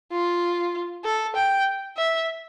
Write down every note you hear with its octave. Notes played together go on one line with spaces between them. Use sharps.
F4
A4
G5
E5